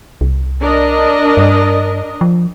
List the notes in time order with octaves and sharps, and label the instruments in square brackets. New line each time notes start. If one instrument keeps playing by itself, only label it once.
[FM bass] C2
[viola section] D4 A#4 D#5
[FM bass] G2
F3